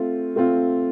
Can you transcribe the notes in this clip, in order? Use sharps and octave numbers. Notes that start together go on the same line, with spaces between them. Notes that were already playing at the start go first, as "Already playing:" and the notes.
Already playing: A3 C4 F4
A3 C4 F4